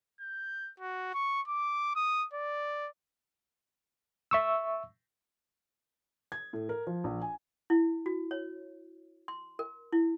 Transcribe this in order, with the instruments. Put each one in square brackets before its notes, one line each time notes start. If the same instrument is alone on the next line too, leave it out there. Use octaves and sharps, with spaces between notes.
[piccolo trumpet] G6
F#4
C#6
D6
D#6
D5
[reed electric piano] E5 C#6 E6
[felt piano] G#6
A2
A#4
F3
A#1
G#5
[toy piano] E4
F#4
C#5
C6
A#4
E4